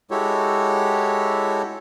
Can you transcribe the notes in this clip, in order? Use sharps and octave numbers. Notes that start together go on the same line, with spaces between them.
G#3 E4 F#4 G4 A4 C#5